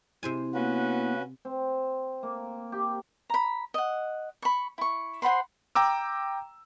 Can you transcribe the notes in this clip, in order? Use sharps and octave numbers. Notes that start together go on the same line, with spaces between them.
C3 E4 C5 G#5
A#3 B3 C#4 F#4 B4
C4
A#3
G4
A#5 B5
D#5 F#5
B5 C#6
E4 C#6
C5 F#5 B5 C6
G5 A#5 D6 E6